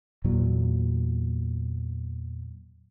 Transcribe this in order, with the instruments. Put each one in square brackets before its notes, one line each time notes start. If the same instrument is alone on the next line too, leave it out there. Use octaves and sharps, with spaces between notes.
[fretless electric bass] E2 A#2 E3 F#3